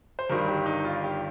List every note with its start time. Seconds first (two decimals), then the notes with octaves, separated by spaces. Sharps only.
0.19 C5
0.30 G1 G2 D#3 G3 A#4
0.48 G4
0.66 D#4
0.84 F4
1.03 G4